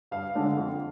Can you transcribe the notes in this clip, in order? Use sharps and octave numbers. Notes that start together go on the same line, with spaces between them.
G2 F5
D3 G#3 D4
F2